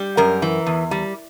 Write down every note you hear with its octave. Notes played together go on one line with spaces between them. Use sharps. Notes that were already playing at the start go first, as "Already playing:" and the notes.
Already playing: G3
F#2 A#4
E3
E2
G3